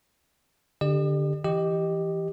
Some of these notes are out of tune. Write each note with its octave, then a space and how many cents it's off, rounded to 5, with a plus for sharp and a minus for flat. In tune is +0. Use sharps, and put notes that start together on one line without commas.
D3 +0 G4 +15 D5 +45
E3 +0 G4 +0 D#5 -10